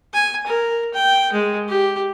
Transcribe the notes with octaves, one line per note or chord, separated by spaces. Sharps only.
G#5
A#4
G5
G#3
G4